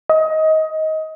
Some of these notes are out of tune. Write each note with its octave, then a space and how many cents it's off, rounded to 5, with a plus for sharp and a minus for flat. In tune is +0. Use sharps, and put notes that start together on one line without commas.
D#5 +20